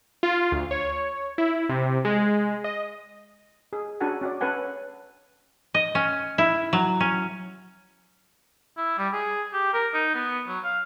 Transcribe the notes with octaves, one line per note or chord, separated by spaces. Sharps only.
F4
D2
C#5
E4
C3
G#3
D#5
G#4
C#4 D4 F#4 A4 F#5 G#5
C#4 F#4 D5
C#4 A4 B4 F#5 G#5
D#5
C#4
E4
F#3
C#4
E4
G3
G#4
G4
A#4
D#4
B3
F#3
F5